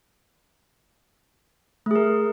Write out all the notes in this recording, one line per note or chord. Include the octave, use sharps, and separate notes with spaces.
A3 G#4 A#4